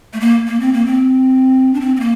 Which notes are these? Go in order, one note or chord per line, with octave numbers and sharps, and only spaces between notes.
A3
A#3
A#3
C4
A#3
C4
D4
C4
C4
A#3